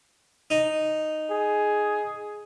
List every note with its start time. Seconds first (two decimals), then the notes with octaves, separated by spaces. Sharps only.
0.50 D#4
1.30 G#4